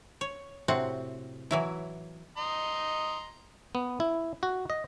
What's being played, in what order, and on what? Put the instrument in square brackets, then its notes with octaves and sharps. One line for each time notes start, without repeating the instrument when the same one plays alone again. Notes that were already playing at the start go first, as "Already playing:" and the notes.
[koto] C#5
A2 C3 C4 F#4 F#5
E3 F#3 E4
[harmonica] D#5 A#5 C6
[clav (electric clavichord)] B3
E4
F#4
D#5